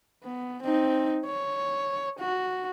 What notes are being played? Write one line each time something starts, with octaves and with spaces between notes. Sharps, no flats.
B3
C4 D#4
C#5
F#4